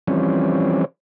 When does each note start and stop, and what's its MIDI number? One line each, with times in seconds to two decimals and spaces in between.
0.07 0.85 52
0.07 0.85 53
0.07 0.85 55
0.07 0.85 60
0.07 0.85 61